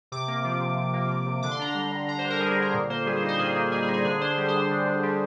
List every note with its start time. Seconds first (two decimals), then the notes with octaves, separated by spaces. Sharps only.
0.12 C3 D6
0.28 A#3
0.44 F3
0.61 C3
0.77 C3
0.94 A#3
1.10 F3
1.26 C3
1.43 D3 D6
1.51 C6
1.59 D4 A#5
1.70 G3 C6
1.92 D3
2.08 D3 A#5
2.19 C5
2.24 D4
2.30 A#4
2.40 G3 G#4
2.52 G#4
2.57 D3 A#4
2.74 A#2
2.90 A#3 C5
3.06 G3 G#4
3.17 C5
3.23 D#4
3.28 C5
3.39 A#2 G#4
3.55 A#3 G#4
3.72 G3 G#4
3.83 G#4
3.88 D#4
3.94 G#4
4.04 D3 G#4
4.21 D4 C5
4.38 G3
4.48 C5
4.54 D3
4.71 D3
4.87 D4
5.03 G3